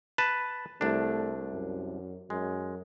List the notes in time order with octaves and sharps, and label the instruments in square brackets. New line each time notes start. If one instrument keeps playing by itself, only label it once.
[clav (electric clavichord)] B4 A5
[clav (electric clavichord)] C2 D4 [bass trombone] A3
[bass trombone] F#2
[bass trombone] F#2 [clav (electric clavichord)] G#3